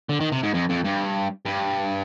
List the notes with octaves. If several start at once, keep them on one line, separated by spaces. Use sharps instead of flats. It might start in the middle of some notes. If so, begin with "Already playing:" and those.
D3
D#3
C3
G#2
F2
F2
G2
G2